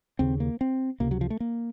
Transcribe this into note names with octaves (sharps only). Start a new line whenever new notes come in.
D#2 C#3 C4
A#3
C4
C#2 C3 A#3
F#3
F3
A3
A#3